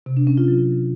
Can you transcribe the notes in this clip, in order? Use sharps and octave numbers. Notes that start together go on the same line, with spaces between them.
C3
D4
C#4
F4
F#3